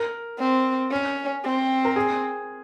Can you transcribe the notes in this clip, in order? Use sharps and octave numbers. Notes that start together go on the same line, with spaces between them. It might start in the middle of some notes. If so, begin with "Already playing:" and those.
Already playing: A#4
C4
C#4
C4
A#4
G#4